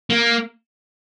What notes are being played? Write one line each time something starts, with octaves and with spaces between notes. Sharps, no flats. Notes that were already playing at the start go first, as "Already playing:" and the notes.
A#3